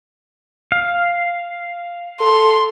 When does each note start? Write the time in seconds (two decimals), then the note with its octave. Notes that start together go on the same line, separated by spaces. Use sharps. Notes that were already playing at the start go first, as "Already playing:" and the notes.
0.72 F5
2.20 A4 C6